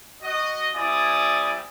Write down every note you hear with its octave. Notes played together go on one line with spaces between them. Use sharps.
F#4 D#5
G3 C4 E4 D5 G#5 D#6